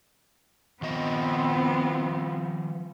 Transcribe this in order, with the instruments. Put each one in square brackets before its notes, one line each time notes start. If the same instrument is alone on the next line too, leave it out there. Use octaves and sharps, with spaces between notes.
[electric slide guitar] D#3 F3 D#5 [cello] B3 C4